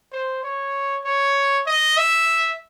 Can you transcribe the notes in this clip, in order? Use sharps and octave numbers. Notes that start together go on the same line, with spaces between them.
C5
C#5
C#5
D#5
E5